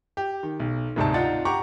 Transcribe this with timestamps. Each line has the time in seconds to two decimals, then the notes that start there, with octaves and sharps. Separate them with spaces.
0.17 G4
0.43 D#3
0.60 B1
0.96 D2 G#2 C3 D4 A5
1.14 D4 D#4 F4 F#5 A6
1.45 G4 F#5 A#5 C#6 D6